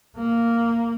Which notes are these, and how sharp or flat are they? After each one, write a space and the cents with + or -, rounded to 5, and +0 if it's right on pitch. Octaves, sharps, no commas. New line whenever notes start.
A#3 -10